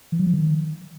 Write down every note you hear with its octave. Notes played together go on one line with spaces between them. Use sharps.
E3
F#3
F3
D#3